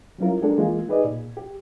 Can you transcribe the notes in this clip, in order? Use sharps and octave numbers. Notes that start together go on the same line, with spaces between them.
F#3 G3 C#4 E4 F4 A#4
G#3 D4 G4 A4 A#4
E3 G#3 A#3 F4
D#4 G4 G#4 B4 D5 D#5
A#2
G4